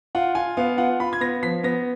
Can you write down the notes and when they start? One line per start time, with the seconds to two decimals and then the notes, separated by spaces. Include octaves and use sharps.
0.15 F4 F#5
0.35 F4 G#5
0.57 B3 F5
0.78 F4 F#5
1.00 F4 B5
1.13 G#6
1.21 B3 A#6
1.42 F3 B6
1.63 B3 A#6